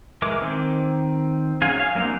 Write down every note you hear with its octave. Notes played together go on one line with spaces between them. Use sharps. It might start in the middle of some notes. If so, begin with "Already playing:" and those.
E3 G#3 A#4 D6
D#3 C4
F#3 C#4 G#4 F5 G#5
F5
F#3 A#3 C4 D4 D#4